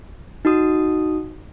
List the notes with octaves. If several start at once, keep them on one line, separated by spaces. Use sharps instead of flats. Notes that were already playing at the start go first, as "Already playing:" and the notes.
D#4 F#4 D#6